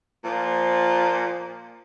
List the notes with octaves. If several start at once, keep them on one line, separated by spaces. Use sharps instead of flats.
A#2 F3